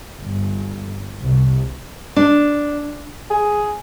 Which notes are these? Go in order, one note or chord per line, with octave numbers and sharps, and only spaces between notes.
G1
C2
D4
G#4